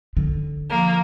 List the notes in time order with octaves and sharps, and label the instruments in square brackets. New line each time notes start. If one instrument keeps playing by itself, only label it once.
[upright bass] D3
[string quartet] F3 A#3